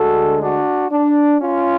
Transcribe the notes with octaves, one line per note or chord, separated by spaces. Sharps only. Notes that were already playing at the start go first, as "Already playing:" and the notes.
Already playing: D2 D3 G#3 F#4 A4
D4 F#4
D4
C#4 F4